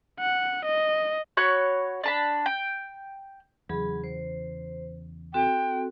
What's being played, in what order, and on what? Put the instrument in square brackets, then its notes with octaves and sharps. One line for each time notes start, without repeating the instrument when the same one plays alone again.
[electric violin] F#5
D#5
[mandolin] F#4 C#5 B5 F#6
D4 A5 B5
G5
[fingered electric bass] E2 C#3 [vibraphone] F#3 G#4 B5
[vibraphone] C5
[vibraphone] C4 F#4 A4 [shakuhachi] G5